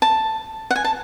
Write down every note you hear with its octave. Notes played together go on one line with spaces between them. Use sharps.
A5
F#5
G#5
A5